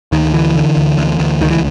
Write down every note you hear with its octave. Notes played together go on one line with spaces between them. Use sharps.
D2 D#3
D3 E3
D3
D2
D2
D2
C#2 D#3
E3